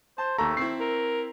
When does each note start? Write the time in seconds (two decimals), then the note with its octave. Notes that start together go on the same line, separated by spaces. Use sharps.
0.18 C5 A5
0.38 D#2 A3 A4 A#5
0.57 C4 E4 C7
0.80 A#4